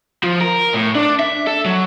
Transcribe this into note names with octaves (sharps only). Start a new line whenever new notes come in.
F3
A#4
A2
D4
E5
A4
F#3